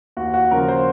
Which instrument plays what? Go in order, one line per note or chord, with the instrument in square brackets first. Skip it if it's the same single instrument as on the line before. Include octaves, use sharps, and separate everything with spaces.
[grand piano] D#2 F#4
F#4
C#3 F3 A#4
C5